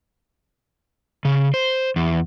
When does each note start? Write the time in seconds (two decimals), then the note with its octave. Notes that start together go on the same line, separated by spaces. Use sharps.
1.25 C#3
1.54 C5
1.96 E2